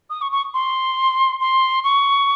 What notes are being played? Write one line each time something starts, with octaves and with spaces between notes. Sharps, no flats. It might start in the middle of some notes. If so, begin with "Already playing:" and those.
D#6
C#6
C#6
C6
C6
C#6